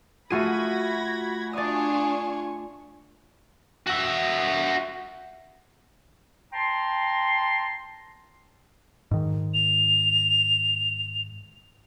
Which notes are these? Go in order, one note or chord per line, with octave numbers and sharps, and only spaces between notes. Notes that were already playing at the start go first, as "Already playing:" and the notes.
A3 F4 F#4 G#4 B5 G#6 A#6 D#7
D4 F4 D5 G#5 C#6 D#6
F#4 E5
G5 A5 A#5 C6
G#2 D#3
F7